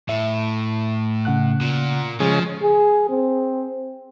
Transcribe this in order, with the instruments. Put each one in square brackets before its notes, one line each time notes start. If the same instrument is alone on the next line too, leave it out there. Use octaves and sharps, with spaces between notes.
[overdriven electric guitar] A2 [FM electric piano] E5
[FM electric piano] C#3 F#5 F#6
[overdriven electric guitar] A#2
[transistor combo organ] C#3 G#3 [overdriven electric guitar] F3
[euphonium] G#4
C4